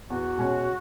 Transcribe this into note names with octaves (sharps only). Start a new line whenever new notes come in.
E2 F#4
B2 G#3 C#4